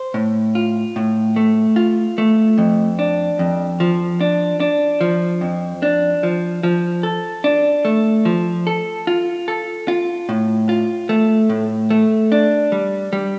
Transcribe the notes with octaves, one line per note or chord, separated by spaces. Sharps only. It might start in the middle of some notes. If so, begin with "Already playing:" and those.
Already playing: C5
A2
F4
A2
A3
F4
A3
F2
D4
F2
F3
D4
D4
F3
F2
D4
F3
F3
A4
D4
A3
F3
A4
F4
A4
F4
A2
F4
A3
A2
A3
D4
G3
G3